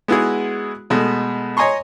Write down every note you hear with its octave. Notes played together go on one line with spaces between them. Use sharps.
G#3 B3 E4 F#4 G#4
B2 G#3 A3
C#5 D#5 G#5 A#5 C6 C#6